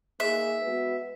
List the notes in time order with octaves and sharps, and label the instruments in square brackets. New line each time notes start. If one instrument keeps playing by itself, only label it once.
[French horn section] A#3 D#4 G#4 [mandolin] E5
[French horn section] G#3 B3 F#4 B4